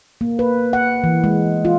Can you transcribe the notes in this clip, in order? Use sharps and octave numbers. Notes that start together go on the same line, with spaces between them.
A#3
B4
F#5
E3
G#3
F4